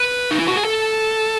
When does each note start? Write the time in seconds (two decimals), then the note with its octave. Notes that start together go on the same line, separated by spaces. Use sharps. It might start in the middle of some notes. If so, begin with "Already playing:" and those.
Already playing: B4
0.31 D#4
0.39 E4
0.48 F#4
0.56 G#4
0.65 A4